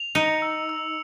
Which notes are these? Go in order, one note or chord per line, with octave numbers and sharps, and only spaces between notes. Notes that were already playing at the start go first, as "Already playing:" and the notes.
Already playing: F7
D#4 C#7
E6
E6